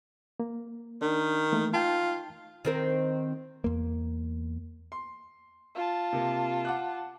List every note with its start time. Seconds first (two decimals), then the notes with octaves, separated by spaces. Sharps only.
0.40 A#3
1.01 D#3 D4
1.52 E3 A3 A#3
1.74 D#4 F4 G5 A5
2.65 D#3 C4 A#4
3.64 E2 A#3
4.92 C6
5.75 F4 A5
6.13 C3 A#3
6.65 F#5 D6 F#6